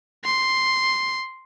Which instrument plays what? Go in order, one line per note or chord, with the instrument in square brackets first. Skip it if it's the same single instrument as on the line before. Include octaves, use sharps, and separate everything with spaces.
[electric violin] C6